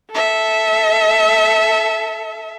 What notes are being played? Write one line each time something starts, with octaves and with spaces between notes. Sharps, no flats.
A4 E5